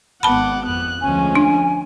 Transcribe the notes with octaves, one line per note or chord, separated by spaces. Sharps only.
G#1 B3 F#5 A5 B5 D6
F2 B3 F#6
D2 F3 G#3 C#4 G#5
D4